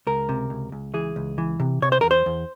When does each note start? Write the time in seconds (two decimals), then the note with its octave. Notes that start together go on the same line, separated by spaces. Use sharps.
0.07 C#2 A#4
0.29 C3
0.50 C#2
0.72 C#2
0.94 E3 G#4
1.16 C#2
1.38 E3
1.60 C3
1.82 C3 C#5
1.92 C5
2.01 E2 A#4
2.11 C5
2.26 E2